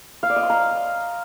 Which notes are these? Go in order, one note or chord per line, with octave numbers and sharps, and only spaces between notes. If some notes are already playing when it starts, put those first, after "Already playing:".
F5
D5
D#5
C6
A#5